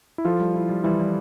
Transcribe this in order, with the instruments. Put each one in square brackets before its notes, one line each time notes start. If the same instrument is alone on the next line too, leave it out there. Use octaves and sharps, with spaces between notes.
[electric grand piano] E4
[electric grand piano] F3 F4 [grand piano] A4
[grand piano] G3
E4
G3
[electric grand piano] E3 E4 [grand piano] G3
[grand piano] G3